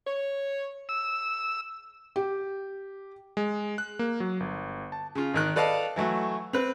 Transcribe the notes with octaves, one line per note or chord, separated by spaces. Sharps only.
C#5
E6
G4
G#3
F#6
A#3
F#3
G1
A5
C#3 F4
G#1 D#3 F#6
A4 B4 D5 D#5 F5 A5
E3 F#3 A3 F#4
C4 B4